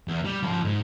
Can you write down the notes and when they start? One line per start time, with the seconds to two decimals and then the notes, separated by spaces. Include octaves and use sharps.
0.08 E2
0.25 G3
0.43 F3 C#4
0.64 G#2